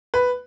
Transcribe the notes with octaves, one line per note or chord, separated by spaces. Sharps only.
B4